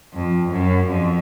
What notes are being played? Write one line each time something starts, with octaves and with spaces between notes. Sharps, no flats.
F2
F#2
F2